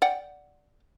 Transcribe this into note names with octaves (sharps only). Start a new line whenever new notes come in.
D5 F#5 G5